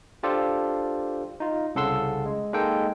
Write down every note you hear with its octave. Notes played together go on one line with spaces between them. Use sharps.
D4 F4 G4 A4 C5 D5
D#4 F4
C2 C#3 A4 F#5 C6 E6
G#3
G#3 A#3 D#4 A4 G5